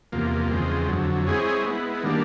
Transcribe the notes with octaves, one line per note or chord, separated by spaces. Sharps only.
E2 C3 F3 A#3
E2 C#3 F3 G#3 C4
F2 D3 F#3
G#3 C4 E4 G#4 C#5
G#3 B3 E4
D#3 G3 A#3 D4